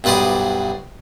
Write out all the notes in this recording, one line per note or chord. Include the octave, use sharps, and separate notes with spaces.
B1 G2 B4 C5 D5 D#6